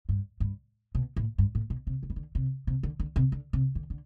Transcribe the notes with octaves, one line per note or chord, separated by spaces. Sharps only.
G2
G2
B2
A2
G2
A2
B2
C3
D3
E3
D3
C3
C3
D3
D3
C3
D3
C3
D3
D3